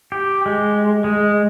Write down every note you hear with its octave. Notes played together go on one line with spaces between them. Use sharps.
G4
G#3
G#3